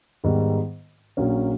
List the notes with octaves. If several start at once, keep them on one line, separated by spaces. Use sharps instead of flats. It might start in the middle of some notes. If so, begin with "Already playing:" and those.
G#2 D#3 G3 B3
A#1 A#2 F#3 A#3 C#4